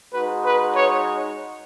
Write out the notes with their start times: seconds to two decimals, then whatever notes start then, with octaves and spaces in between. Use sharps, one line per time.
0.12 G#3 D#4 F#4 B4
0.44 B4
0.76 C#5